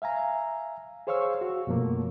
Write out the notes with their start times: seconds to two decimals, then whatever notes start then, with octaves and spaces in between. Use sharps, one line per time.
0.02 E5 F5 G#5 A#5
1.07 G#4 C5 C#5 F5 C#6 E6
1.41 F#4
1.67 F#2 B2 F3 A3 A#3